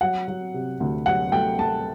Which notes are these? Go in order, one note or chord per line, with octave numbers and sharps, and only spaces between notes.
F#3 F#5
F#3
C3
D2
F#3 F#5
A3 G5
A3 A5